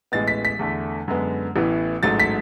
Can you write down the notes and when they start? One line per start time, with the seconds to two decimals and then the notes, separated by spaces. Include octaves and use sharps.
0.12 A1 A2 G#3 B3 A6
0.28 B6
0.45 B6
0.59 E2 D3 A3
1.08 F#2 D3 G#3 B3
1.56 A1 A2 E3 B3
2.03 A1 G#2 F#3 A3 A6
2.20 B6